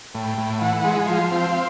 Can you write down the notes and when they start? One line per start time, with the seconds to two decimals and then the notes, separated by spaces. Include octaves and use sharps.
0.14 A2 G5
0.38 A2
0.61 E3 F#5
0.84 G#3
1.08 F3 F5
1.32 C4